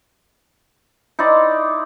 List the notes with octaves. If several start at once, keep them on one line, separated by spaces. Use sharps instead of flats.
D#4 E4 C5 D5